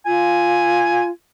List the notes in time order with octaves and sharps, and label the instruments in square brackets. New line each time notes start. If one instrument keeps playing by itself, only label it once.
[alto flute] F4 [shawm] G#5